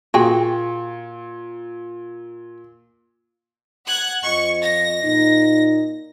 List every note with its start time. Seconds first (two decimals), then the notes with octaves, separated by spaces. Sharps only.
0.14 A#2 F#4 G#4 G5
3.85 F#5 F#6 G#6
4.23 F2 F3 D#5 C#6
4.61 A#6
5.02 A#2 D#4